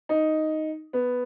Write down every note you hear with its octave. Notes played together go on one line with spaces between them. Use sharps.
D#4
B3